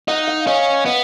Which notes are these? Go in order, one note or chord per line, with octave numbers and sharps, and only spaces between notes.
D#4 F#5
F5
C#4 D#5
B3 D#5